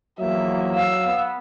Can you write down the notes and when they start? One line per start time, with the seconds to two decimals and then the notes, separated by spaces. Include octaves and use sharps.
0.20 E2 F3 F#3 A#3 E5
0.75 F5 E6
1.06 B3